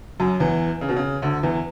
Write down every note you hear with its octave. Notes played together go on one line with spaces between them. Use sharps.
F#2 F#3
E2 E3
C#3
B2
C#3
D2 D3
E2 E3